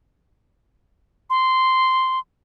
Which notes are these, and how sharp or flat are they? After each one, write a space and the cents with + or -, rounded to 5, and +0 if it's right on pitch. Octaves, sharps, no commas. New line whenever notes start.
C6 -10